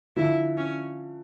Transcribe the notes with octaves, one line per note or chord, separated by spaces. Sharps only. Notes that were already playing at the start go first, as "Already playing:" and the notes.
D3 F3 E4
C#4